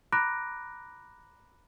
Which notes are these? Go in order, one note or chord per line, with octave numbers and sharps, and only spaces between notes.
A#5 B5 D6 F#6 A#6 D7